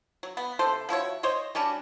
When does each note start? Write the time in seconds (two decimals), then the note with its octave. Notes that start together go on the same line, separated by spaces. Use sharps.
0.23 F#3
0.37 B3
0.59 C3 A4 C5
0.89 F3 E4 F#4 C#5
1.23 C5 C#5 D#5
1.55 G3 C#4 D4 F#4